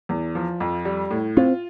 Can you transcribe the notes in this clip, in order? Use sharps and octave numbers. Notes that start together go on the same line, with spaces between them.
E2
F3
F2
G3
A2
C4 F4